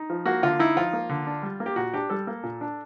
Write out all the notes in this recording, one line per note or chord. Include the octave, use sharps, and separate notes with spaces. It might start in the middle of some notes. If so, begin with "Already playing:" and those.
Already playing: D#4
F3
A#3 F#4
D3 F4
D#4 E4
F3 F4
A#3
D3
D4
G3
A#3
G4
A#2 F#4
D4 G4
G3 A4
A#3
A#2
D4